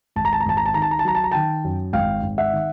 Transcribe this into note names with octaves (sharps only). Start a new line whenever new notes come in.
G#1 A5
A#5
A5
A#5
G#1 A5
A#5
A5
D#3 A#5
A5
A#5
A5
F#3 A#5
A5
A#5
D#3 G5 A5
F#2
G#1 F5 G5
G#1
E5 F#5
D#3